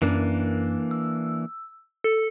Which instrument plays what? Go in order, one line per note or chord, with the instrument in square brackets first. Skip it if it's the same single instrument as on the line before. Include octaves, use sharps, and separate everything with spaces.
[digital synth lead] F#2 [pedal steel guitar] E3 A#3 D4
[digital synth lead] E6
A4